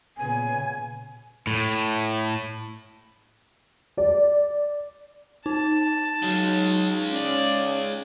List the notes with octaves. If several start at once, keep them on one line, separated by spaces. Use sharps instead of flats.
A#2 C#3 B3 G#5
A2
D5
D#4 A5
C#3 F#3 G#3
C#4 D5